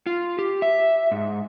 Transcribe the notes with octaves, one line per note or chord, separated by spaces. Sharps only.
F4
G4
E5
G#2